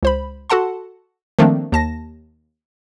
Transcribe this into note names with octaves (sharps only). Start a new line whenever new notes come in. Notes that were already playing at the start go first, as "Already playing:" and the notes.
C#2 C5 B5
F#4 A4 F#5 A5 C6
D#3 F3 A3 A#3 C4 D4
D#2 A5 A#6